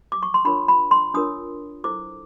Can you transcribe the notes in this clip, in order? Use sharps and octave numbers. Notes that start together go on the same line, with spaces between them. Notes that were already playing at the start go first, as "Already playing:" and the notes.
D6
C#6
C6
D4 F4 A#4 C#5 B5
B5
C6
D4 F4 A#4 C#5 D#6
E4 A4 C5 D6